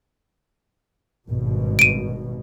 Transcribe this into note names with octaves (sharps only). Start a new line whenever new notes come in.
G#1 G2 B2
D7 D#7